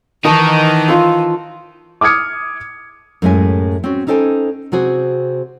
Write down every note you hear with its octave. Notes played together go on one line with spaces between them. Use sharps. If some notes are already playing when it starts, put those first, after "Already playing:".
D#3 E3 D#4 A#4 A5 C#6 D#6
F4 C6 E6
D6 D#6 F6 G#6 C#7
F#2 A2 G#3 C#4 E5 G#5
C4 C#4 F#4
C#4 D#4 A4 C5 G5 G#5
C3 C4 F#4 G#4 C5